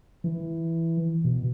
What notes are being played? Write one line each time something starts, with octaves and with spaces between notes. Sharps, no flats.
E3
B2